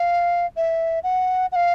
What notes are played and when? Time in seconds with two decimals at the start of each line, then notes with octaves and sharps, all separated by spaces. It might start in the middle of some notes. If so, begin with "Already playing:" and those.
Already playing: F5
0.57 E5
1.04 F#5
1.52 F#5
1.56 F5